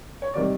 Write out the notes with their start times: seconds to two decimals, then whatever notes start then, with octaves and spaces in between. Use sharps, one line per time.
0.22 C#5
0.34 C3 D#3 G3 D5